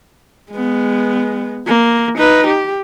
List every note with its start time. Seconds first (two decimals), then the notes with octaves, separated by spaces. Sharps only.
0.52 G#3 B3
1.67 A#3
2.17 D#4 B4
2.46 G4